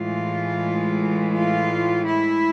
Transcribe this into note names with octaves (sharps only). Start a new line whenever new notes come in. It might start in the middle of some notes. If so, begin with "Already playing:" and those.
Already playing: A2 E3 G#3 F4
F4
E4